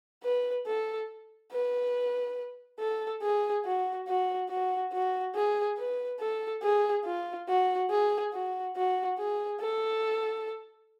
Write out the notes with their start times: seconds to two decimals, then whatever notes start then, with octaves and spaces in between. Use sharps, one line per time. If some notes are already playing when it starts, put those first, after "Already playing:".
0.23 B4
0.67 A4
1.52 B4
2.80 A4
3.23 G#4
3.65 F#4
4.07 F#4
4.50 F#4
4.93 F#4
5.35 G#4
5.78 B4
6.20 A4
6.62 G#4
7.05 F4
7.48 F#4
7.90 G#4
8.33 F#4
8.76 F#4
9.18 G#4
9.60 A4